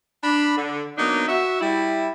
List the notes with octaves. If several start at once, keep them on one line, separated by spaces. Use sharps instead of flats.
D4 B5
D3
F#3 A#3 B3 D4 D#4
F#4 E5
G3 E4